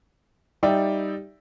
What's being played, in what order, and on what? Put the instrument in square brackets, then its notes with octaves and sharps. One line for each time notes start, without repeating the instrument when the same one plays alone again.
[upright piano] G3 D#4 D5 E5 G5